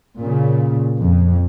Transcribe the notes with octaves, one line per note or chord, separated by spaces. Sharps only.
A#2 C#3
F2